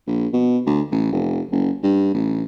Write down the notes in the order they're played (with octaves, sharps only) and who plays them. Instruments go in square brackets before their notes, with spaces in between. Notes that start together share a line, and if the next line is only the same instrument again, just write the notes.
[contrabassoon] A#1
B2
D2
A1
F1
F#1
G2
A1